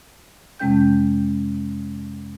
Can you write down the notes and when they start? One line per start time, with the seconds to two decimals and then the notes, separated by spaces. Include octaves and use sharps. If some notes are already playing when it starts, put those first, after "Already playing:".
0.59 F2 C3 G#3 C#4 G5 G6